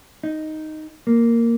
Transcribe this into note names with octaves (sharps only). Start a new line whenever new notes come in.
D#4
A#3